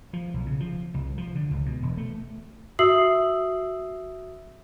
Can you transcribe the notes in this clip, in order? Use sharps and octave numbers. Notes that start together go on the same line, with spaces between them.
F3
B1
C#3
F3
C2
F3
D3
C#2
B2
E1
A3
F#4 E5 D#6 E6 C7 F#7